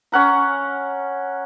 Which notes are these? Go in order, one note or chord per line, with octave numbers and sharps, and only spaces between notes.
C#4 F#5 A#5